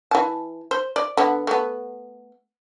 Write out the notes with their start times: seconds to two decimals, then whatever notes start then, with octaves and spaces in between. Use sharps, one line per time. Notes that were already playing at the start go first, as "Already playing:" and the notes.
0.11 E3 A5
0.71 C5
0.96 D5
1.17 D3 B3
1.47 A3 B3